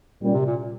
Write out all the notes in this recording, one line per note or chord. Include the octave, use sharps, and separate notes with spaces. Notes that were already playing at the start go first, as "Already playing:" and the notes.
A#2 G3 C#4
C3
A#2